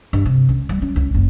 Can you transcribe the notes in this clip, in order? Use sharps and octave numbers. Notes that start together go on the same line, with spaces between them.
G2
C3
C#2
G3
C#4
C#2
F#1